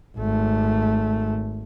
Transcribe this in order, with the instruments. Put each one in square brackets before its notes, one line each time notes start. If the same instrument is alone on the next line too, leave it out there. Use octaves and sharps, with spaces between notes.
[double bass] G#1 A3